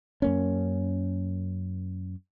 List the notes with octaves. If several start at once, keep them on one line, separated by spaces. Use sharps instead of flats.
F#2 A#3 C#4